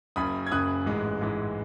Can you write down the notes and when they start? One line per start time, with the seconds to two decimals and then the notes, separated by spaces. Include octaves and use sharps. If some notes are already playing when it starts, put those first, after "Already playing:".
0.16 F#1 F#2 C#3 B5 D#6
0.47 G#6
0.52 F#1 F#2 C#3 D#6 F#6
0.86 A1 G#2 E3 G#3
1.21 A1 G#2 E3 G#3